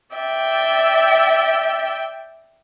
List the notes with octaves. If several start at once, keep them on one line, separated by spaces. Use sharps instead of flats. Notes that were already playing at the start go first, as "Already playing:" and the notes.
D5 E5 G5